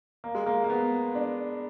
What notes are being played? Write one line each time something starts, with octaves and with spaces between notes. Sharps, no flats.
A#3
G#3
A#3
A#3
B3
D4